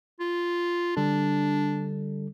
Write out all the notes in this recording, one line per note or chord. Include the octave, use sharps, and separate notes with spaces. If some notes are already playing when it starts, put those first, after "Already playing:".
F4
D3 G3 D4 A4